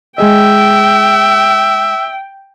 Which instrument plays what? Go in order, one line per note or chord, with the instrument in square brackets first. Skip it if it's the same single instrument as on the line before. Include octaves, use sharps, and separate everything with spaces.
[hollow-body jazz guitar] G#3 G#4 D#5 [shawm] E5 [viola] G5